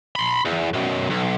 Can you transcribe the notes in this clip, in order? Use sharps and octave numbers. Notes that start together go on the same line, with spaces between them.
B5 C6
E2
F#2 B2
B1